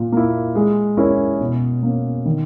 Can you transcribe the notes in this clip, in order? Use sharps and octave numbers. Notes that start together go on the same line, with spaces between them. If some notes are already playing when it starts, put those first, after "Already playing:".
Already playing: A#2
A#3 E4
G#3
C#4 E4 A#4
B2
A#3 C#4
D#3